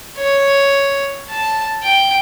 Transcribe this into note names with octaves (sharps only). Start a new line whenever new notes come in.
C#5
A5
G5